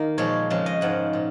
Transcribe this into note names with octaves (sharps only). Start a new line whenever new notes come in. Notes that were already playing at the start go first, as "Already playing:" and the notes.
Already playing: D#3 A#3 A#4
A#2 F3 G#3 C#5
F2 C#3 G#3
D#5
G#2 F3 G#3 F#5
A#2